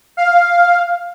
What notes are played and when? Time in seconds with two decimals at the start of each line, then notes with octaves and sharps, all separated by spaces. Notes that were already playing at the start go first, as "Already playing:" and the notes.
0.17 F5